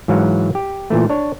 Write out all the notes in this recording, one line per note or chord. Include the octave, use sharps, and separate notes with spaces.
G#2 E3 F#3 F5
G4
A#2 E3 A3
D4 C#5